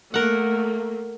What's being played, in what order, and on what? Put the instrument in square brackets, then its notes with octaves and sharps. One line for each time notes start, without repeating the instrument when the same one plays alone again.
[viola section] A3 A#3 [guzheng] A#4 F#5